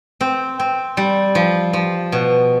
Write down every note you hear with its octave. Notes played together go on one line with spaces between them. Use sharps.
C4
C4
G3
F3
F3
B2